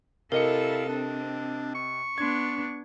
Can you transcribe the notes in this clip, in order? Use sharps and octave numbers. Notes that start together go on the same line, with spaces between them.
C3 E4 A4 A#4 D#5 F5 C#7
C4 D4
C#6
B3 D4 C6 G#6